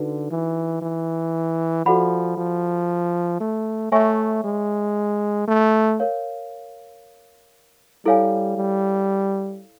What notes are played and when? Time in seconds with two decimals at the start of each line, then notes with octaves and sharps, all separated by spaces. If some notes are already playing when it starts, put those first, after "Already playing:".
Already playing: D3 D#4 F#4 B4
0.30 E3
0.82 E3
1.85 F3 F#4 A4 D5 F#5 B5
2.37 F3
3.40 A3
3.92 A3 C#5 E5 G#5 C#6
4.44 G#3
5.48 A3
6.00 A#4 C#5 F5
8.06 G3 E4 A4 C#5 F5 G#5
8.57 G3